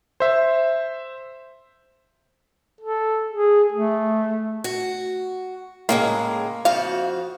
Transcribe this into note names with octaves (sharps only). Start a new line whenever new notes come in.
C5 E5
A4
G#4
A3
F#4
A2 C#3 G#3 A#3
F2 F3 F#4 F5